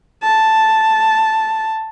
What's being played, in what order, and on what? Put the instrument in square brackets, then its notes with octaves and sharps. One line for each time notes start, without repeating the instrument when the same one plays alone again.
[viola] A5